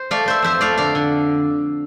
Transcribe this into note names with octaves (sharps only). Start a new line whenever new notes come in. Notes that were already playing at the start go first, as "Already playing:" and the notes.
Already playing: C5
A3 D5 F5
A3 C5 E5
F2 C5 E5
A3 D5 F5
D3 D5 F5
D3